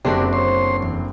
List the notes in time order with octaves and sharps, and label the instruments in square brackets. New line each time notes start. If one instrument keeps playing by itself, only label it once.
[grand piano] F#1 C4 [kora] D3 D4 F#4 [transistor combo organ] G4 D5
[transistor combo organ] C5 C#5 C6
E2